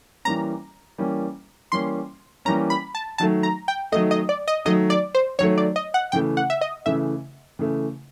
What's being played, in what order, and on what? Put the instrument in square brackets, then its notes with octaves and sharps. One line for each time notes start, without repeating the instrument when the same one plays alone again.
[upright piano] E3 G3 A#3 C#4 [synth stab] A#5
[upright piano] E3 G3 A#3 C#4
[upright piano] E3 G3 A#3 C#4 [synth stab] C6
[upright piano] E3 G3 A#3 C#4 [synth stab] A#5
[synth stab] B5
A5
[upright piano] D#3 F#3 A3 [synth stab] A5
[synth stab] A#5
G5
[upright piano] A3 [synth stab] D#5
[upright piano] D#3 F#3
[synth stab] D#5
D5
D#5
[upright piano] D#3 F#3 A3 [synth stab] D#5
[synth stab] D5
C5
[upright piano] D#3 F#3 A3 [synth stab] C#5
[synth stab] D5
D#5
F#5
[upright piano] C#3 E3 A3 [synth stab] G5
[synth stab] F#5
E5
D#5
[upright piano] C#3 E3 A3 [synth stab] E5
[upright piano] C#3 E3 A3